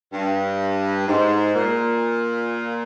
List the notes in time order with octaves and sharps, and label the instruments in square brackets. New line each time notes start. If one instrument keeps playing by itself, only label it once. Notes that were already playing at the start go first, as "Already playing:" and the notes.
[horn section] G2
G#2
A#2